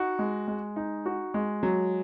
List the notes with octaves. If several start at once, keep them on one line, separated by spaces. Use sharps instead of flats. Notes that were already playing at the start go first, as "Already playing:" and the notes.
Already playing: D#4 F#4
G#3
G#3
D#4
F#4
G#3
F#3